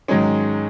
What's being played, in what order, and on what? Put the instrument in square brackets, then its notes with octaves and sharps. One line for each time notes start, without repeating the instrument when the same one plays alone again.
[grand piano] G#2 D#3 F#3 C#4 [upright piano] G#3